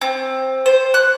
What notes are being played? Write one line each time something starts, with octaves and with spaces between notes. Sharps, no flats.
C4
C5
F#6